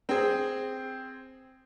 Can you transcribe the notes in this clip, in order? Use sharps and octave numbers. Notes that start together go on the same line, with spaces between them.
C4 G#4